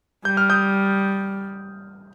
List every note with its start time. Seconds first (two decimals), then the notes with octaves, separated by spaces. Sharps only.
0.25 G3 G6
0.37 F6
0.50 D#6 G6